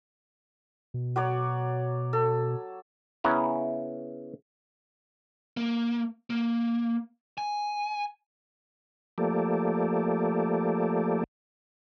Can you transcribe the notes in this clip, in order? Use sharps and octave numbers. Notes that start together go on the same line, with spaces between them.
B2
F#3 C#5 D5
A4
C#3 B3 C#4 E4 A#5
A#3
A#3
G#5
F3 A3 A#3 G4 A4 D5